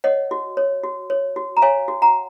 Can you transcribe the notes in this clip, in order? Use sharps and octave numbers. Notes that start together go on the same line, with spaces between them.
C#5 D#5 F#5
F#4
C#5
F#4
C#5
F#4
A#5
C#5 F5 G#5
F#4
F#5 A#5